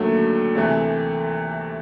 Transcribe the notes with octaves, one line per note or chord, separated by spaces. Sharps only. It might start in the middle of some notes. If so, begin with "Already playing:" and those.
Already playing: D#2 D3 F#3 A3
D2 C3 E3 A3